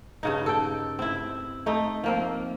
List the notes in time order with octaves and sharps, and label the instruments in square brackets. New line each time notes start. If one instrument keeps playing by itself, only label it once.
[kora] G2 C#3 D#4
A4 G5
C4 E4
A3 D#4
F3 A#3 C4